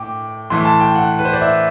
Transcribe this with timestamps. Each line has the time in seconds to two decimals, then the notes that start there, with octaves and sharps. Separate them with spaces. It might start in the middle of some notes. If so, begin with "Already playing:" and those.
Already playing: A2 G5 D6
0.50 A2 E3 C6
0.65 A5
0.80 G5
0.95 F#5
1.19 B4
1.25 C5
1.33 D5
1.41 E5